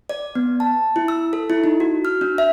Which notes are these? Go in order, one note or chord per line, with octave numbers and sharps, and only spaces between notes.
D5
B3
A5
E4
E6
A4
E4
D#4
F#4
F6
D4
E5